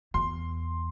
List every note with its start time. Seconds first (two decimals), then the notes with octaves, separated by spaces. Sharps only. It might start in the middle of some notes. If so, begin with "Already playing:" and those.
0.14 E2 C6